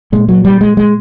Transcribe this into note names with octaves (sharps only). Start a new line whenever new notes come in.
A#2 G#3
F#3
G3
G#3
G#3